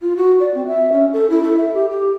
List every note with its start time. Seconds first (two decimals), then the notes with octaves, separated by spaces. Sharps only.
0.01 F4
0.17 F#4
0.40 D5
0.54 C4
0.67 E5
0.92 C#4
1.13 A4
1.30 E4
1.43 A4
1.57 E5
1.74 G4
1.90 G4